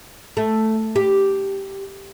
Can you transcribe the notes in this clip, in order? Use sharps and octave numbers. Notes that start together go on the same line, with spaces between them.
A3
G4